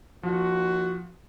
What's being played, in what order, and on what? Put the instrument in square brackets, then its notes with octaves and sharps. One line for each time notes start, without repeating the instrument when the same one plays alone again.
[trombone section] D#2 F4 F#4 [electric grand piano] F3